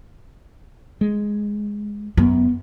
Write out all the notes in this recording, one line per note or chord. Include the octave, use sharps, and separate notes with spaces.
G#3
F#2 B3